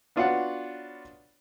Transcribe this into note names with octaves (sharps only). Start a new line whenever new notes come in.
B3 D4 F4 F#4 C#5 F#5